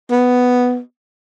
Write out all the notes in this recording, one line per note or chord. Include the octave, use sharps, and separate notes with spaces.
B3